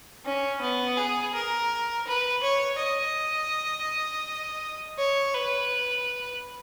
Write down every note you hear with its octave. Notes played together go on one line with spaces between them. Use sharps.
C#4
B3
G#4
A#4
B4
C#5
D#5
C#5
B4